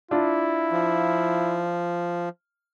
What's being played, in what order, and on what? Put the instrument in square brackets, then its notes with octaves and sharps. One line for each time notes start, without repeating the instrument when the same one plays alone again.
[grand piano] D4 F4 [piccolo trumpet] E4
[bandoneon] F3